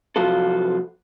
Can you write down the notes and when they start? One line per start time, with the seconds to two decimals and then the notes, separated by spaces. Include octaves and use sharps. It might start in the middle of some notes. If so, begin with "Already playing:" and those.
0.16 C3 F3 F#3 F4 F#4 A4